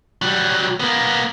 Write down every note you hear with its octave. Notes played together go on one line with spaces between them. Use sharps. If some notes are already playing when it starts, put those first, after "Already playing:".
F#3 G3
A#3 B3